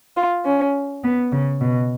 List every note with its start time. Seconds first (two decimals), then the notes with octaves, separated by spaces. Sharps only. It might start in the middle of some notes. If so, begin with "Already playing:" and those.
0.16 F4
0.45 C#4
1.03 B3
1.32 C#3
1.61 B2